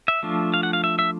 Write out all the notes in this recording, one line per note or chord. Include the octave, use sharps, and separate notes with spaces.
E5
F3 A3 D4 F4
F5
F#5
F5
E5
E5